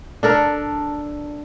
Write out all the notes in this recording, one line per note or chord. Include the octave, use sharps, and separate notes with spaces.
D4 A4 A#4